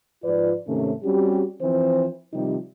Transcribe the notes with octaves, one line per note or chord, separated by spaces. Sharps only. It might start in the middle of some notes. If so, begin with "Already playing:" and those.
G#2 F3 F4 B4 D5
G#2 C3 D#3 A3 C#4
G3 C4 C#4 F#4 G4
E3 F3 C4 C5
C3 D#3 F3 G3 C4 D#4